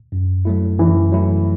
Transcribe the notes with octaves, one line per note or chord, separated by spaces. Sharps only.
F#2
F#3 A3 E4
F#2 E3
F#3 A3 E4